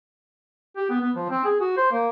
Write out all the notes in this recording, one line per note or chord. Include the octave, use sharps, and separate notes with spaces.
G4
B3
B3
F3
C4
G#4
F#4
C5
A#3